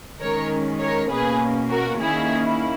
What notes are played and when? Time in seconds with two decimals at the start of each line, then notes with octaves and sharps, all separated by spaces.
0.20 D#3 G#3 C#4 A#4 C#5
0.80 A#4 C#5
1.10 B2 A#3 C#4 G#4 B4
1.70 F#4 A#4
1.99 D#3 A#3 C#4 E4 G#4
2.44 E4